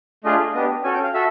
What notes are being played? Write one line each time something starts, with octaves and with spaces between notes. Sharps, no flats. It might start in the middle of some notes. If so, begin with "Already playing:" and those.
A3 D4 F4 G#4 D#5
B3 D4 G4 D#5
C#4 F#4 A4 G#5
G5
F5
F#4 A4 E5